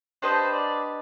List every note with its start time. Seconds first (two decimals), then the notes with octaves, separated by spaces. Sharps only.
0.22 D4 G4 B4 C5 D#5
0.52 D5